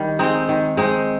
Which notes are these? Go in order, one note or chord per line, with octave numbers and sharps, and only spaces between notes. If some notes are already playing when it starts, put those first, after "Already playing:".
Already playing: D#3 G3
G#3 C4 D#4
D#3
G#3 C4 D#4